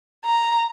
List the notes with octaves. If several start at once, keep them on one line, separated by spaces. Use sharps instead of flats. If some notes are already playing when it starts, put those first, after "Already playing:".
A#5